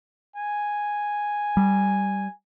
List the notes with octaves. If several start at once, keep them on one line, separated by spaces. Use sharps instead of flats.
G#5
G3